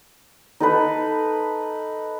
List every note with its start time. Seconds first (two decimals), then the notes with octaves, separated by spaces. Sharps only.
0.60 D#4 A4 B4